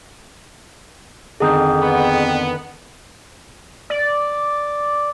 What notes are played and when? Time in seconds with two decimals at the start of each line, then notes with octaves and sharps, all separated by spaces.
1.40 F2 D3 D#3 C4 G#4 D#6 G6
1.81 B3
3.90 D5